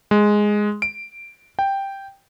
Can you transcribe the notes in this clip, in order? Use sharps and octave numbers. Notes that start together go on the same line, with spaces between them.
G#3
D7
G5